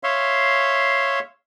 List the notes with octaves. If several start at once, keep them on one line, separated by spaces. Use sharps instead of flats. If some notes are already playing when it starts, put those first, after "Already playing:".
C#5 E5 F5 C6